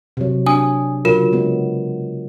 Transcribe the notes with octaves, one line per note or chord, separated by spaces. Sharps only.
C3 F#3
D4 G#5 D#6
C#3 F#3 F4 A#4 E7
C#3 G#3 B3